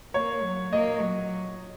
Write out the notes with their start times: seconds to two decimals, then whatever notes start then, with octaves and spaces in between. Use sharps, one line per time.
0.14 A#3 C#5
0.43 F#3
0.72 A#3 D#5
1.01 F#3